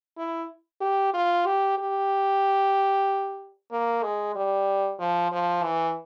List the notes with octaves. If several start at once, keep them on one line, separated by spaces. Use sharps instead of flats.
E4
G4
F4
G4
G4
A#3
G#3
G3
F3
F3
E3